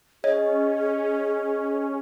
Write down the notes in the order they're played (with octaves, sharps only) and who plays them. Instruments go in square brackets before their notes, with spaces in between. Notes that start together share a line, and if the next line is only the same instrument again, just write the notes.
[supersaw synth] C#4 [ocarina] G#4 [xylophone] C#5 [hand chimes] D#5